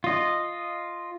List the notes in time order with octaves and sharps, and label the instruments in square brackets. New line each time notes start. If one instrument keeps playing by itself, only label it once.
[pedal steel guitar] F4 D#5